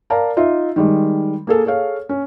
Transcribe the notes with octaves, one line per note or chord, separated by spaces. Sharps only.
A#4 D5 F5 A5 A#5
D#4 F4 E5
D#3 G3 G#3
A#3 G#4 A4
G#4 A4 C#5 F5
C#4